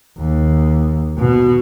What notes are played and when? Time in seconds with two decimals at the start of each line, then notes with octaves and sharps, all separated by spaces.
0.18 D#2
1.18 B2